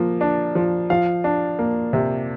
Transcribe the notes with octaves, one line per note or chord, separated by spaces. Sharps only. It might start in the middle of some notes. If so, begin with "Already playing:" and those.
Already playing: F3 A#3
D4
F3
F3 F5
D4
A#3
C3